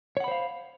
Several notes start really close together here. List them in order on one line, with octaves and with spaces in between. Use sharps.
C#5 F#5 B5 C5 F5